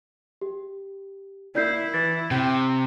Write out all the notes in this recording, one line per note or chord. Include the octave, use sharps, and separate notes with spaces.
G4
A#3 E4 D5 G6 C7
E3 A6
C3 G5